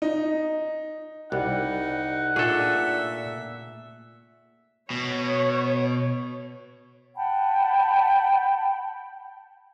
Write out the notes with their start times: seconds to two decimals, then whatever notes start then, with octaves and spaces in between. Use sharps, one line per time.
0.02 D#4
1.32 C2 G3 D#4 F#5
2.36 A#2 A3 D4 G#4 A4 E5
4.90 B2 C#5
7.16 F#5 G5 A5 B5